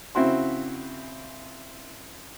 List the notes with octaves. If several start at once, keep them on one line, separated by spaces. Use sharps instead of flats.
C#3 C4 E4 F#4 C6